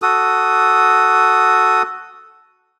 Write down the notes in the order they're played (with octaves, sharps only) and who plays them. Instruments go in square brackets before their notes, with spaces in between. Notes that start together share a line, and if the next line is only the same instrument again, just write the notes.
[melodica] F#4 A4 D#6